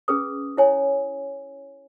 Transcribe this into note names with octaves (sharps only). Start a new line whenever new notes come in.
C#4 G#4 B4 D#6
E4 C#5 G#5